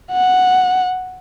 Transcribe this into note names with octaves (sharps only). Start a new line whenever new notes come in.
F#5